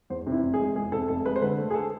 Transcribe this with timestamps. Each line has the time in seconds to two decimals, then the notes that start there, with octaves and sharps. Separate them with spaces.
0.10 E2 C5
0.27 C3
0.32 E4
0.43 F1
0.54 G#4
0.59 G#3
0.76 E2 G#4
0.92 C3 A4
1.08 F1 A4
1.26 G#3 B4
1.36 C5
1.41 D3 B4
1.58 A3
1.70 G#4
1.74 A4